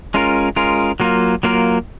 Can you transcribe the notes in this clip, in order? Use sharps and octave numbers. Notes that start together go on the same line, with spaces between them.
G#3 C#4 F4 A#4
G#3 C#4 F4 A#4
F#3 A#3 F4 A#4
F#3 A#3 F4 A#4